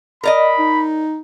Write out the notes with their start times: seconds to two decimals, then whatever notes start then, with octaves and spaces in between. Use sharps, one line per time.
0.24 A#4 D5 D#5 B5
0.59 D#4